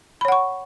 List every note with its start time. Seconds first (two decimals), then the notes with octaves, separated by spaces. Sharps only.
0.21 B5
0.25 C#5
0.28 F#5
0.32 C#6